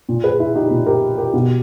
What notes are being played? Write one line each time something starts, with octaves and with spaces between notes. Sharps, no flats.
A#2
G#4 B4
E4 G#4
D#4 G4
A#2
G4 A#4
G4 A#4
B2